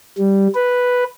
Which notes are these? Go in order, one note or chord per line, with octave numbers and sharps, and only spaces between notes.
G3
B4